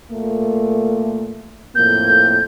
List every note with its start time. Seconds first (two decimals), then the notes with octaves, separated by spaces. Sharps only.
0.11 A#2 A3 A#3
1.75 F2 A2 A#3 G6